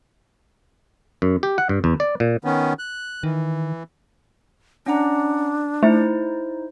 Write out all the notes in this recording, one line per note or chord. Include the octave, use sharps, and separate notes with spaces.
F#2
G4
F#5
G2
E2
D5
A#2
D#3 B3 C#4
F#6
D#3 E3
C#4 D4 F#5 A#5
A3 D#4 E4 C5